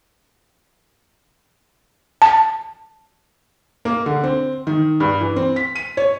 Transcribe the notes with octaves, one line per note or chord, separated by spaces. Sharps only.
A5
A#3
D3
C4
D#3
G2
E3
C4
B6
D#7
C#5